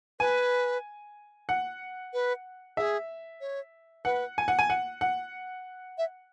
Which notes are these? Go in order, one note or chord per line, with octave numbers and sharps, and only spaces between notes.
B4 G#5
F#5
B4
G#4 E5
C#5
B4 F#5
G#5
F#5
G#5
F#5
F#5
E5